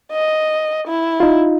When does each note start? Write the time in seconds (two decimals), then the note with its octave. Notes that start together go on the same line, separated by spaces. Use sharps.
0.12 D#5
0.87 E4
1.20 D#4 F4